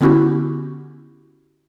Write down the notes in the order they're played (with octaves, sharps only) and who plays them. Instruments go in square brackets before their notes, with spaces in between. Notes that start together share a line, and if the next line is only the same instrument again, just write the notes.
[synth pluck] D3 B3 C#4 E4 F#4 G4